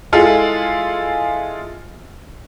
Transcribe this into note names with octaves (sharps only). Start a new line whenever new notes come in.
G#3 E4 F4 G#4 A4